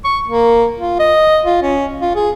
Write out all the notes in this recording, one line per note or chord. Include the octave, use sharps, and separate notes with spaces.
C#6
A#3
F4
D#5
F4
C#4
F4
G#4